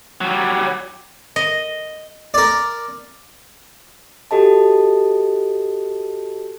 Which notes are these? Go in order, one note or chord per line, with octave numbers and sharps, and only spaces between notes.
F#3 G3
D#5
A#4 D5
F#4 G4 A4 D#5 A5